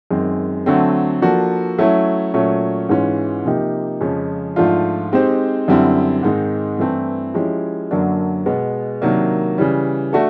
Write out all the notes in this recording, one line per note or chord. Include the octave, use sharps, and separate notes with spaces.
F#2 D#3 G#3 C4
D3 F#3 A3 C4
F3 A#3 D4 F#4 A4
F#3 A3 C#4 E4
A#2 F#3 A3 C#4
G#2 E3 G#3 C#4 F4
C3 F3 A#3 D#4 G4
F2 C#3 F3 G#3 C#4
G#2 F3 A3 D4 F4
G#3 C4 D#4 G4 C5
F#2 D3 G3 C4 E4
G#2 D#3 G#3 C4 D#4
G2 E3 A3 C4 E4
F3 G#3 C#4 E4 G4
F#2 D3 F#3 A#3 D4
B2 G#3 B3
C3 D#3 F#3 A#3 D4
C#3 E3 G3
A3 D4 F#4 A4